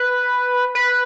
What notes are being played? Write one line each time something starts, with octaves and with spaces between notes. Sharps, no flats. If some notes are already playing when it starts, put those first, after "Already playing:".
Already playing: B4
B4